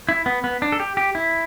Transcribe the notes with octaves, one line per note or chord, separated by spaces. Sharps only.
E4
B3
B3
D4
A4
G4
G4
E4